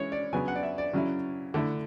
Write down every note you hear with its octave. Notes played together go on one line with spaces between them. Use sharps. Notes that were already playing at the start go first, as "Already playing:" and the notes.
Already playing: E3 G#3 C#4 E4 C#5
D5
C#3 F#3 B3 G#5
F#5
D5
E5
D5
C#3 F#3 C#4 E4
D3 A3 E4